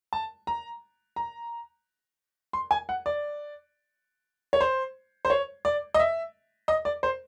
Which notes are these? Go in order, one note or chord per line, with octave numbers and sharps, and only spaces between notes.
A5
A#5
A#5
C6
G#5
F#5
D5
C#5
C5
C5
C#5
D5
D#5
E5
D#5
D5
C5